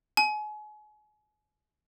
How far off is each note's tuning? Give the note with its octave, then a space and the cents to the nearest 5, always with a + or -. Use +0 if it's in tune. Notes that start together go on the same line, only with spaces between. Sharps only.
G#5 +35